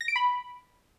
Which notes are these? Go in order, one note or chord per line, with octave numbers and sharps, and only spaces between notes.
A#6
D7
B5